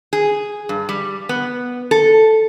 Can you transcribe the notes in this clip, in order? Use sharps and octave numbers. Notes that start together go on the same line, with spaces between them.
G#4
G2
G3
B3
A4